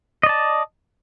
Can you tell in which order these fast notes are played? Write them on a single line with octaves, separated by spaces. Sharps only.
D#5 D5 A5